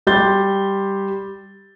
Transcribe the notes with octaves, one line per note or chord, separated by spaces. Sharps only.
G3 G4 C6 G6 A6